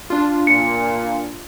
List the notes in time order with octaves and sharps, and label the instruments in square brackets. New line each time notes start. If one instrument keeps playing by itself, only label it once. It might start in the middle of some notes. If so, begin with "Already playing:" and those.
[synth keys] D4 F4
[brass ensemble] A#2 [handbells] C#7